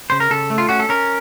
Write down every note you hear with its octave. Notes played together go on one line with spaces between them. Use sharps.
C#3 C5
A#4
C#3 A4
A3
F4
C#4 F#4
A4
C#4 A#4